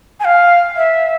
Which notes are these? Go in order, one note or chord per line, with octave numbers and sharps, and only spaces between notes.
G#5
F5
E5